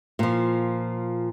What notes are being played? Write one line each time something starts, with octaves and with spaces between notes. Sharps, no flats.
A#2 F3